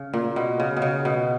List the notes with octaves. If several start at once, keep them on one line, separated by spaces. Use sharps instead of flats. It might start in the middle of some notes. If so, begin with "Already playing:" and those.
Already playing: C#3
A#2
B2
C#3
B2
C#3
B2